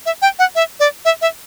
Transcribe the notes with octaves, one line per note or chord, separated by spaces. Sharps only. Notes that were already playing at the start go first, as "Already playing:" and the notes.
E5
G5
F#5
E5
D5
E5
E5